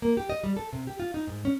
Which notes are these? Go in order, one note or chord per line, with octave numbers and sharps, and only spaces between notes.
A#3
G4
D#5
G3
A4
C3
G4
F4
D#4
G#2
C#4